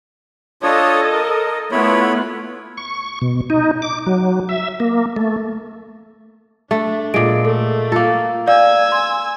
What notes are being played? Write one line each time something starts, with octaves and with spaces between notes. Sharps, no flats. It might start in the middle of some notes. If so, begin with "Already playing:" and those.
D4 F4 A4 C#5 D#5
A#4
A3 B3 E4 F4 C#5 B5
C#6
B2
D#4
D6
F#3
E5
A#3
A3
A3 D4
A#2 G#3 D7
A3 A4
A#3 F4 A4
D5 F5 G#5 E6
C6